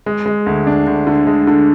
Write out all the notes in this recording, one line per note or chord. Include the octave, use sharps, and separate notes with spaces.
G#3
G#3
D2
D4
D2
D3
G#3
D3